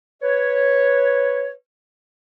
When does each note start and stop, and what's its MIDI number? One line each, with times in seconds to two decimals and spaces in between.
0.22 1.52 71
0.22 1.52 73